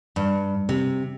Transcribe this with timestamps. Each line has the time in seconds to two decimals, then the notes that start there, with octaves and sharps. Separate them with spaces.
0.16 G2
0.69 C3